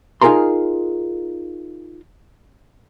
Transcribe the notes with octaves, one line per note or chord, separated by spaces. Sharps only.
D#4 F4 G#4 A#4 A#5 C6